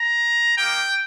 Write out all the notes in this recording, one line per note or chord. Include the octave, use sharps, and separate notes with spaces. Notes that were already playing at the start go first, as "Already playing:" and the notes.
Already playing: A#5
A#3 D#4 G4 G5